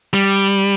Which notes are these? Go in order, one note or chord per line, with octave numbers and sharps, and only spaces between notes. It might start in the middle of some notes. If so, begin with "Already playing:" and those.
G3